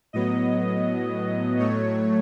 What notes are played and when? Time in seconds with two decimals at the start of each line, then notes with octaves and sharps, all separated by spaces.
0.13 A2 F#3 B3 D#5
1.58 A2 F#3 A3 C#5